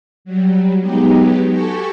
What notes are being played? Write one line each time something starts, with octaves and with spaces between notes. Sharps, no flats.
F#3 G3
F#3 G#3 B3 D#4 G4
F#4 G4 A4 G#5 C#6